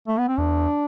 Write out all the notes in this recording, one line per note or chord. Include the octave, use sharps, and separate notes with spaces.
A3
B3
C4
E2 D4